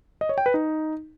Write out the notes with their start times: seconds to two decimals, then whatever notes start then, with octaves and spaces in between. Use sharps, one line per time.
0.21 D#5
0.29 C#5
0.38 G5
0.46 B4
0.54 D#4